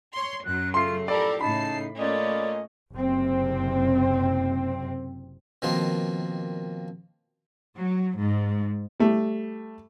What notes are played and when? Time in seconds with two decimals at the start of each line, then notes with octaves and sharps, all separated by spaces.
0.14 C#5 C6
0.44 F#2 F#3 F#6
0.74 C#3 A3 F4 C6 C7
1.08 A2 F3 G4 A4 A#4 D5 B5
1.41 A2 C#3 D#4 A5 B5 C7
1.98 A3 A#3 C#4 F4 D5 D#5
2.92 F#1 C3 C4
5.62 B2 D#3 F3 A#3 C4
7.76 F#3
8.18 G#2
9.00 G3 A3